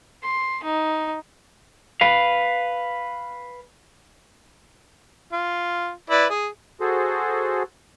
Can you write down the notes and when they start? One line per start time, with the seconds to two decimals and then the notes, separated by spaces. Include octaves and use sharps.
0.23 C6
0.63 D#4
2.01 B4 F5
5.33 F4
6.10 E4 B4 D5
6.30 G#4
6.80 F#4 G#4 A4 C5